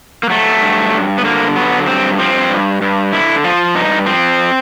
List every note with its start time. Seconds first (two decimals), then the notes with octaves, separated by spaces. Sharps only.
0.23 A#3
0.30 F#3 A3
0.62 G2
0.94 G2
1.18 B3
1.24 D3 A#3
1.56 F#3 B3
1.87 G2 C4
2.18 F3 C4
2.49 G2
2.82 G2
3.12 D3 E4
3.44 F3 F4
3.75 G2 D#4
4.06 F3 C4